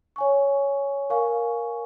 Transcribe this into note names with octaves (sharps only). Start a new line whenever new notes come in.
C#5 G#5 C#6
A#4 F5 G#5 C#6